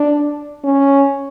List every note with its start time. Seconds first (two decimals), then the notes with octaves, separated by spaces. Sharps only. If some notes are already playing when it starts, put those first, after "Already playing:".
Already playing: D4
0.64 C#4